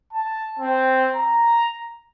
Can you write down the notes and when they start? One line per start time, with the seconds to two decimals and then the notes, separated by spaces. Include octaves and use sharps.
0.13 A5
0.59 C4
1.16 A#5